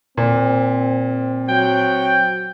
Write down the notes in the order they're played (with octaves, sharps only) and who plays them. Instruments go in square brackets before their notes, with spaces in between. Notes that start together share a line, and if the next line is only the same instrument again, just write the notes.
[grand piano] A#2 [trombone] C4
[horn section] F#3 G5